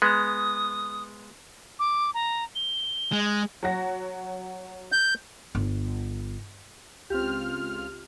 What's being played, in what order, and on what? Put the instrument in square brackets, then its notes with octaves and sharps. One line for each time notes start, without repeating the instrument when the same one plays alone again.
[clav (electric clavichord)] G#3 B3 [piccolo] D#6
[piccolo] D6
A#5
G7
[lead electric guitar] G#3
[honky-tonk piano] F#3 F#4 A#6
[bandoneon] G6
[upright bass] G1
[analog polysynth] C#2 F4 F6 [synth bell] C4 G4